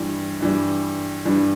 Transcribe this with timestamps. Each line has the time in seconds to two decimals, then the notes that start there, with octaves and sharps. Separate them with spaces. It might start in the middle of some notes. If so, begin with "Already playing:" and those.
Already playing: G2 E3 G3
0.40 G2 E3 G3
1.25 G2 E3 G3